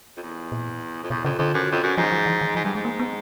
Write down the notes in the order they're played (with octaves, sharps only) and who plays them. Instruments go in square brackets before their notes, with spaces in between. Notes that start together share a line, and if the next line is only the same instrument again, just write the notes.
[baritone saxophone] F2
E2
[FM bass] A#2
[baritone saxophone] F2
[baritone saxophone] E2 [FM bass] B2
[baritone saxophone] F2 [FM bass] C#3
[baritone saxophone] F2 [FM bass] D3
[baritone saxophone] F#2
F2
F#2
[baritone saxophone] G#2 [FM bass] F3
[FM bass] F3
E3
D#3
[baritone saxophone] G#2 [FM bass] F3
[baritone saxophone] G2 [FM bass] G3
[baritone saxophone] G#2 [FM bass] G#3
[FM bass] A#3
B3